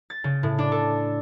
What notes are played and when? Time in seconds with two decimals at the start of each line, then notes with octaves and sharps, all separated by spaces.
0.10 A6
0.24 C#3
0.43 A2
0.59 D4
0.72 A4